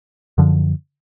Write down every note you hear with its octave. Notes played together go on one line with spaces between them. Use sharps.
F#2 D3 F3